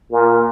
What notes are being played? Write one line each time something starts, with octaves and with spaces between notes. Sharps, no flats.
A#2